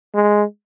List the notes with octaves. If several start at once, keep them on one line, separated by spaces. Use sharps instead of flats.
G#3